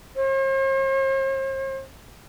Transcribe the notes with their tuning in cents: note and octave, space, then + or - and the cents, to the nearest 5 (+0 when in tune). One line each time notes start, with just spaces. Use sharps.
C5 +45